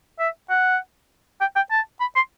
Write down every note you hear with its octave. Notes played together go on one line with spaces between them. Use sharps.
E5
F#5
G5
G5
A5
B5
C6